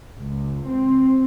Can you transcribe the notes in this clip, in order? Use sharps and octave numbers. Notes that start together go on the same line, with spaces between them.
C#2
C4